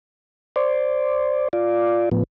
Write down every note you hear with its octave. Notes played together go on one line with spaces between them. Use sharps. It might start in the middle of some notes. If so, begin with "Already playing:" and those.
C5 D5
F4 D5
A2 F3 B3